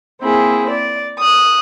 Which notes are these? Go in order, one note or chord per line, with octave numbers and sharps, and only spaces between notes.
A#3 C4 E4 G#4
D5
D#6 F#6